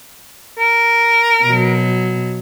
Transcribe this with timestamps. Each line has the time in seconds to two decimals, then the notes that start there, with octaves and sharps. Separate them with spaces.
0.59 A#4
1.44 B2 F#3